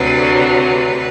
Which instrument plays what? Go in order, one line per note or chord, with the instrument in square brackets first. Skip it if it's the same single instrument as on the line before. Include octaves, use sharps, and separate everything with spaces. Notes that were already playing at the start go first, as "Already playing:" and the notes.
Already playing: [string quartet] D2 C3 F#3 B4
B4